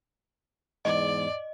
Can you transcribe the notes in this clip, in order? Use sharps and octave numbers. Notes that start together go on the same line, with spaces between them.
E2 G#2 D5 D#5